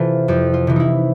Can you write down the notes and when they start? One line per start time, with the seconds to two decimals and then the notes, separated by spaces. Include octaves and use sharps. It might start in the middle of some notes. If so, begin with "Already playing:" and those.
Already playing: C3 E3 F4 A4
0.28 F2 G4
0.54 F4
0.67 C3 E3
0.76 D#4 E4